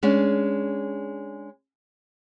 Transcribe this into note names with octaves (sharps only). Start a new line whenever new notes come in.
G#3 C#4 D4